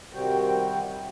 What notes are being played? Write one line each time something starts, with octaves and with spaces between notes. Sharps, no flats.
C3 D#3 G3 C4 F#4 G5